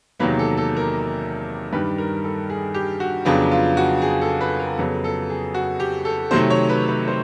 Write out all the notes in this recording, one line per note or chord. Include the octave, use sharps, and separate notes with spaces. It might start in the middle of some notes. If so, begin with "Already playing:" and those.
E2 C3 D#3 F#3 A#3 B4
A4
A4
A#4
G2 D#3 G3 B4
A#4
A4
G#4
G4
F#4
F2 C#3 F#3 B3 D4 F4
F4
F#4
G#4
A4
B4
A#4
F2 C#3 F#3 B3 A4
A4
G#4
F#4
G4
A4
C3 D#3 F#3 A3 C5
C#5
B4
B4
C5